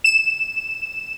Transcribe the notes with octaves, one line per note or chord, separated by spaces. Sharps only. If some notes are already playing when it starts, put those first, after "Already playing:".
E7